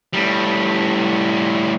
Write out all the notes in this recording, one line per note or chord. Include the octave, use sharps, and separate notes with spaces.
A2 G3